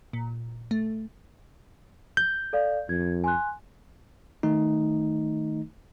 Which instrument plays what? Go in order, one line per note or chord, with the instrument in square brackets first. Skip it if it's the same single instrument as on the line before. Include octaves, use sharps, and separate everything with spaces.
[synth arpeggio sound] A#2
A3
[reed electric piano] G6
[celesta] A4 D5 F5
[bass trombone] F2 [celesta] G#6
[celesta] G#5 C6 F#6
[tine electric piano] D#3 A3 D#4